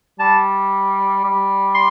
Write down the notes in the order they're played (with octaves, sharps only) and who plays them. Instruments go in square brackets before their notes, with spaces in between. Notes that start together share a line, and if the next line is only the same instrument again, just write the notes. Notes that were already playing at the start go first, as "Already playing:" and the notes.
[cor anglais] G3 [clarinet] A5
[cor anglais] G3
[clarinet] C6